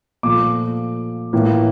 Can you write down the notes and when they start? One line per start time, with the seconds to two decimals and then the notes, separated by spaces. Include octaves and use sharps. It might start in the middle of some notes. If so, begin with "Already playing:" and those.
0.23 A#2 F3 A3 D6
1.33 A2 E3 A#3